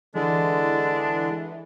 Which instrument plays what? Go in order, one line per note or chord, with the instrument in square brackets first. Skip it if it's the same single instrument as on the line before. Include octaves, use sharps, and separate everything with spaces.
[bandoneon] D3 G#3 [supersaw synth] E3 [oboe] D4